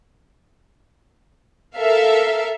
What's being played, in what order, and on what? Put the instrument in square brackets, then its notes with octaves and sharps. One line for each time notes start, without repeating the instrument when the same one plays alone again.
[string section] A4 A#4 E5 F5